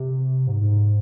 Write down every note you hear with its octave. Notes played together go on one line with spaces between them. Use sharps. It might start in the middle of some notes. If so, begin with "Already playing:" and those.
Already playing: C3
G#2
G#2